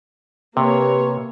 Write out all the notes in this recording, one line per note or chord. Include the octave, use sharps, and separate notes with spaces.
C3 A#3 G4 B4 C#5